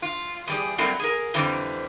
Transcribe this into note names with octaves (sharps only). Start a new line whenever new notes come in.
F4
E2 G3 G#4
F#3 G3 A3 A#3 C4 F4
G#4 A#4
F2 D3 E3 G3 C4